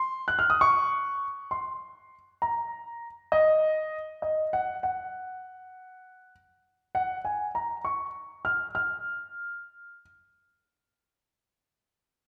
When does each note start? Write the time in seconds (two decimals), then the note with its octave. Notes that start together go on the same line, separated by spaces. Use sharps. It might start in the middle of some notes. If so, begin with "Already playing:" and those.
Already playing: C6
0.28 F#6
0.39 F6
0.50 D#6
0.61 C#6
1.51 C6
2.42 A#5
3.32 D#5
4.22 D#5
4.53 F#5
4.83 F#5
6.95 F#5
7.25 G#5
7.55 A#5
7.85 C#6
8.45 F6
8.75 F6